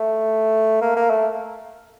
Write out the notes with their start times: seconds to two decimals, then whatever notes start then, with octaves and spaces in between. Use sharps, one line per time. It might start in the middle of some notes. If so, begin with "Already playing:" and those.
Already playing: A3
0.81 A#3
0.96 A#3
1.10 A3